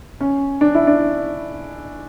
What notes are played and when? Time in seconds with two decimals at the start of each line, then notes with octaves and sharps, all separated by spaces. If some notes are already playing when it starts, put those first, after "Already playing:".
0.21 C#4
0.61 D4
0.75 E4
0.87 D4